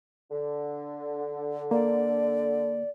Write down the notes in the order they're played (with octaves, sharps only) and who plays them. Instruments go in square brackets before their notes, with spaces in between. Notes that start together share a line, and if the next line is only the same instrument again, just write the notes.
[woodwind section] D3
[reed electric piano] A#3 [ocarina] D5